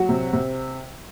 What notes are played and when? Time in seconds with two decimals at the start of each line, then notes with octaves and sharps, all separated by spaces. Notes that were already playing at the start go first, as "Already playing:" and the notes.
Already playing: F#3 F#4
0.09 C3
0.33 C3